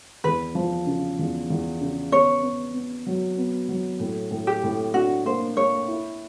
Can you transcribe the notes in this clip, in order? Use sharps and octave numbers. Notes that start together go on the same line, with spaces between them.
E2 B4
F3
C#3
E2
E2
C#3
B3 C#5
B3
B3
F#3
B3
F#3
A2
A2
G4
A2
D4 F#4
A#3 C5
A#3 C#5
E4